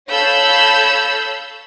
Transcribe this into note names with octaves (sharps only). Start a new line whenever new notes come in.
A4 C#5 F5 B5 E6 G6